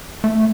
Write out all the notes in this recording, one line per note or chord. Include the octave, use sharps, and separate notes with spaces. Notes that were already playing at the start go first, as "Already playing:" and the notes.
A3